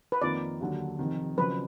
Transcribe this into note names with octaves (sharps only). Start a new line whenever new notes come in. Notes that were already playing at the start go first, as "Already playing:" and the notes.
B4
F2 D#3 A#3 F4 A#4 D5
D#2 D3 F#3 D4
F1 F2 D#3
F#1 F#2 F3 B4